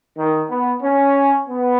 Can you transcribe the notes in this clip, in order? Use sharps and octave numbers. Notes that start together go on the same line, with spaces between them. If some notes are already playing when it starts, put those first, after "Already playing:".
D#3
B3
C#4
B3